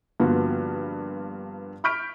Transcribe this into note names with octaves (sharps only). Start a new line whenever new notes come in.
G2 D3 F3 A#3 B3 F#4
B5 C#6 F6 G6 B6 D7